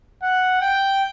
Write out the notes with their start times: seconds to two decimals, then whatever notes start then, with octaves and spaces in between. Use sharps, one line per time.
0.23 F#5
0.61 G5